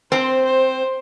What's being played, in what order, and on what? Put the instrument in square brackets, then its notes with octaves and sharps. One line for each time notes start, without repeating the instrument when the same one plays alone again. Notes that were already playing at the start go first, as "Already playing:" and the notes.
[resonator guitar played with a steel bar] C4 [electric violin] C5
[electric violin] C5